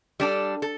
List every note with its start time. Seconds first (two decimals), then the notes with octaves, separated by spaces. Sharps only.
0.20 G3 D4 A4
0.62 A4